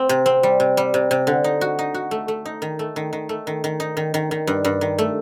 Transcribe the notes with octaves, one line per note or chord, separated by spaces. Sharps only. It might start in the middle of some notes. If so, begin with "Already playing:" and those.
Already playing: C4
C3
C4
G3
C3
G3
C3
C3
D3
D#4
F#4
D#4
F#4
A3
A3
D#4
D#3
A3
D#3
D#3
A3
D#3
D#3
D#4
D#3
D#3
D#3
G2
G2
D#3
A3